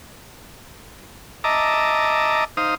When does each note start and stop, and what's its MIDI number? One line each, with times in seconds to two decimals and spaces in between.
1.44 2.44 75
1.44 2.44 76
1.44 2.44 81
1.44 2.44 82
1.44 2.44 86
2.57 2.75 63
2.57 2.75 72
2.57 2.75 77
2.57 2.75 87